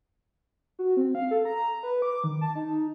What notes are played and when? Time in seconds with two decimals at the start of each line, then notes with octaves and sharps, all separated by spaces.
0.79 F#4
0.97 C4
1.15 F5
1.31 A4
1.45 A#5
1.83 B4
2.02 D6
2.24 D#3
2.41 A5
2.55 D#4